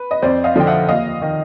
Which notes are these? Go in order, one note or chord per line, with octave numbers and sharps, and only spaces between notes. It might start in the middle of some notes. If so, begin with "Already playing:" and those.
Already playing: B4
D#5
F2 C5 D5
D#5 F5
D3 F3 G5
E5 F#5
D#2 D#5 F5
D#3